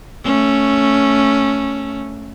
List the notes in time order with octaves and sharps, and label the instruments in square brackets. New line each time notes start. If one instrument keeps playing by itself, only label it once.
[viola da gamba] A3 C#4